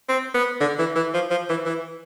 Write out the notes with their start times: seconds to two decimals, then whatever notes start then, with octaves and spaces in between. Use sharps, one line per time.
0.09 C4
0.34 B3
0.61 D3
0.79 E3
0.96 E3
1.14 F3
1.31 F3
1.49 E3
1.66 E3